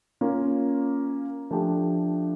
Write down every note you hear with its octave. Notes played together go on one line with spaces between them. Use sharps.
A#3 C#4 F4
F3 A3 D4 G4